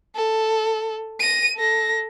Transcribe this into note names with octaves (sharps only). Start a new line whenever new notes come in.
A4
A#6 D#7
A4 A#6